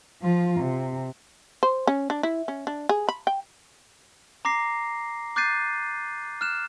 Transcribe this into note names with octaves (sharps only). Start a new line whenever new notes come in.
F3 F4
C3
C5
C#4
D4
E4
C#4
D4
G#4
B5
G5
A#5 D6 A#6 C7
D6 F#6 G6 A6 C7 D#7
F6 F#6 E7